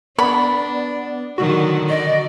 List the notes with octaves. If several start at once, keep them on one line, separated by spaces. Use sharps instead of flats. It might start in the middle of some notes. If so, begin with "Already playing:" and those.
B3 D4 D5 B5
D3 D#3 F#3 F#4
D3 D5 D#5